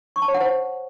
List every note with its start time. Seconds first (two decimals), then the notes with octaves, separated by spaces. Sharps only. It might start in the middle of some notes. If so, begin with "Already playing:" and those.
0.16 C#6
0.22 A5
0.28 C#5
0.34 F#5
0.41 C5